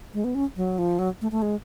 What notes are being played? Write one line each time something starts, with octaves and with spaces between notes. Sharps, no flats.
G#3
B3
C#4
F#3
F3
F#3
A3
A3
G#3